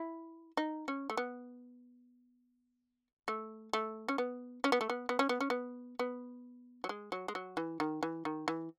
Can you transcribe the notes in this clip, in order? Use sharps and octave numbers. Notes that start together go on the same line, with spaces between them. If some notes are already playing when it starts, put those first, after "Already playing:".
Already playing: E4
D#4
C#4
A3
B3
A3
A3
C#4
B3
C#4
B3
A3
B3
B3
C#4
B3
C#4
B3
B3
F#3
G#3
F#3
G#3
F#3
E3
D#3
E3
D#3
E3